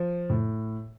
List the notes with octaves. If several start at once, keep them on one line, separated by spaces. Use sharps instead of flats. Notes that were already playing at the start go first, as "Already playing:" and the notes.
Already playing: F3
A2